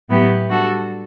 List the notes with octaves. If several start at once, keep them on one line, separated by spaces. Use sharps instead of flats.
A2 F#3 B3 E4 G4
G3 D4 F#4 A4